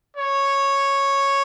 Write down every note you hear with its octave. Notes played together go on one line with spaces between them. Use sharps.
C#5